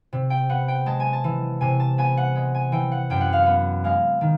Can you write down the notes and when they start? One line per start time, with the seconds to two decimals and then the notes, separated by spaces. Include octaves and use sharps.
0.13 C3
0.30 G5
0.49 B3 F#5
0.68 G5
0.86 G#3 A5
1.00 G#5
1.13 A5
1.24 E3
1.61 C3 G#5
1.80 A5
1.98 B3 G#5
2.17 F#5
2.35 G#3
2.55 G#5
2.72 E3 G5
2.92 F#5
3.10 F#2 G5
3.21 F#5
3.33 F5
3.43 B3 F#5
3.84 G#3 F5
4.21 D#3